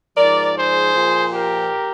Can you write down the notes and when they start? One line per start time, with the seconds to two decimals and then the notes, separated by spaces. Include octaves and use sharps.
0.17 G#2 F3 A#4 D5
0.56 G#4 C5
0.94 A#2 F3
1.32 G4 A#4